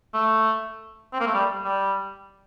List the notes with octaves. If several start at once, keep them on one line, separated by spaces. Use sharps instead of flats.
A3
C4
A#3
A3
G3
G3